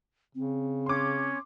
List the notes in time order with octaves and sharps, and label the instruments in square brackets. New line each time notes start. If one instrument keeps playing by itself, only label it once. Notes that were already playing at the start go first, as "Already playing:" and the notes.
[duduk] C#3 [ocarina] C4
[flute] C#4 [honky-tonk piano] C6 D6